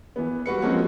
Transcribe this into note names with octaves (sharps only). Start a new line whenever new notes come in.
E3 B3
G3 F#4 B4 C#7
F3 G#3 A#3 C4 C#4 F#4